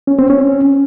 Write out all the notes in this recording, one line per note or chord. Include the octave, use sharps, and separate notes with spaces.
C#4
C4
C#4